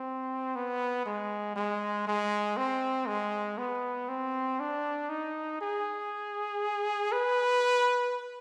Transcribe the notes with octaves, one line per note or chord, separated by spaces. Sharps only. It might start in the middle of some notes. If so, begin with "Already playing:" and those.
Already playing: C4
B3
G#3
G#3
G#3
C4
G#3
B3
C4
D4
D#4
G#4
B4